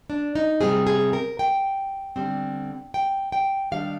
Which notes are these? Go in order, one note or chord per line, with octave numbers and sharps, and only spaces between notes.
D4
D#4
C3 G3 C4 G#4
G#4
A#4
G5
D3 G3 C4
G5
G5
D#3 G3 D4 F5